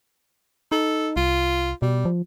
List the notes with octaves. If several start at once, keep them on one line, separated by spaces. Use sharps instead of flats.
D#4 A4
C2 F4
B2 G3
F3